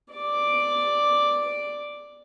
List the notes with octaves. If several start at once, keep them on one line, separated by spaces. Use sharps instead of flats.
D5 D6